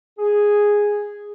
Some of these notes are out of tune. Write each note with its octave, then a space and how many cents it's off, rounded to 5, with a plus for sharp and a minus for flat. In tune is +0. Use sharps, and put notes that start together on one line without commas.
G#4 -5